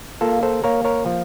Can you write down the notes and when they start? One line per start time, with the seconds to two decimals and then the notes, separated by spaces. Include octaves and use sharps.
0.21 A#3 F4 A4
0.43 A4 C5
0.64 A#3 A#4 C#5
0.85 A#4 C#5
1.06 F3